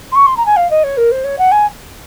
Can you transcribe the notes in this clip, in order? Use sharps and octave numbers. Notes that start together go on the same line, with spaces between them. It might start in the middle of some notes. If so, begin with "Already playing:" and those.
C6
C#6
C6
A#5
G#5
F5
D#5
C#5
A#4
C5
C#5
F#5
G#5